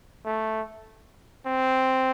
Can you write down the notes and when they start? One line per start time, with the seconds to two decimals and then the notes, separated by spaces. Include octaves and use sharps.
0.25 A3
1.46 C4